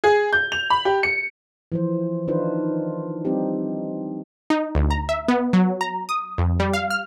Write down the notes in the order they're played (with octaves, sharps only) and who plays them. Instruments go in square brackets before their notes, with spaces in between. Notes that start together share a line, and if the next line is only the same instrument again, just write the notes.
[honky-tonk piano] G#4
G6
F7
B5
G4
C#7
[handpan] E3 F3 C5
D#3 D4 D#4 F4 B4 C5
G3 C4 D4 D#4 G4
[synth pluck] D#4
D2
A#5
E5
B3
F#3
A#5
D#6
F2
G3
F5
F6